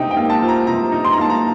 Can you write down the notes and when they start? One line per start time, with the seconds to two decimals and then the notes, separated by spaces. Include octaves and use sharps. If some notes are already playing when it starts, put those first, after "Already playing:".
Already playing: C3 A#3 D#4 G5
0.11 G5
0.17 A#3
0.30 A5
0.42 F3
0.49 A#5
0.67 C3 A#5
0.92 D#4
1.05 C6
1.13 A#5
1.18 A#3 A5
1.30 A#5